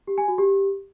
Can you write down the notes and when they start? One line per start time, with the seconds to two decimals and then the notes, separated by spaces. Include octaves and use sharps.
0.07 G4
0.18 G#5
0.28 F#4
0.38 G4